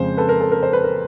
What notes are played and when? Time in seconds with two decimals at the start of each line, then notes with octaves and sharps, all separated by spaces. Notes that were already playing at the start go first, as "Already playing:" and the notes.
Already playing: F2 C#3 F3 G#3 C5
0.17 A4 B4
0.29 A#4
0.41 A4
0.52 A#4
0.63 C5
0.73 B4
0.84 A#4